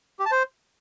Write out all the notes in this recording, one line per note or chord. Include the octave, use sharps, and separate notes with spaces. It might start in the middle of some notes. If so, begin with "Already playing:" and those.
G4
A5
C5